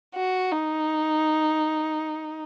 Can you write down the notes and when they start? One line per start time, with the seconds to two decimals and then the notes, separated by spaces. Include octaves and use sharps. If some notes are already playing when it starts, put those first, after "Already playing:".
0.15 F#4
0.52 D#4